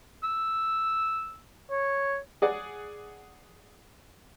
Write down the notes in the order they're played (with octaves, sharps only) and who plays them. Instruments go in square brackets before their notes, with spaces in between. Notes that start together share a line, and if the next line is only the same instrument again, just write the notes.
[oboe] E6
C#5
[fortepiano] G#4 D5 F#5